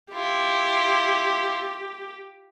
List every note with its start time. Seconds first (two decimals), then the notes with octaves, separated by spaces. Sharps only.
0.13 E4 F4 G4